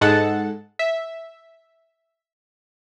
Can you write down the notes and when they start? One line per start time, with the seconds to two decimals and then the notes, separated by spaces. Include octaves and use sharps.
0.01 G#2 G#3 A4 F#5 A5 A6
0.79 E5